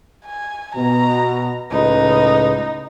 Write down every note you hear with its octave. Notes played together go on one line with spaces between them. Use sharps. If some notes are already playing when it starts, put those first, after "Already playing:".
G#5
B2 A#5
C#2 A2 D#4 B4